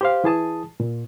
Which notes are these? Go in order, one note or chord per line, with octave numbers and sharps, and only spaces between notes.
G4 C5 F5
E3 G#4 A5 D#6
A#2